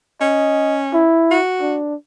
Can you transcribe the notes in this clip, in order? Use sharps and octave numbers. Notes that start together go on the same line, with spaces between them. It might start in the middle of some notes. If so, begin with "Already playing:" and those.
C#4 D#5
E4
F#4
D4